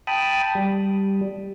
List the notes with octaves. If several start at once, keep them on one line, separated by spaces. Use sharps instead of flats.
G5 A5 B5 D#6
G3